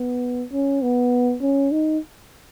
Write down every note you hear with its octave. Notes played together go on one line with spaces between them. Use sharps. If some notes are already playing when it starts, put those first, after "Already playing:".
Already playing: B3
C#4
B3
C#4
D#4